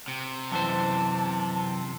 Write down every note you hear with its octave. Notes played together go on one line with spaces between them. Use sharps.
C3
F#2 E3 C5 A5